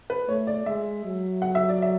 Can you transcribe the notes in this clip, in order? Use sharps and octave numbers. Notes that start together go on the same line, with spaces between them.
B4
A3 C#5
D5
G#3 E5
F#3
F#5
E5
D5
E5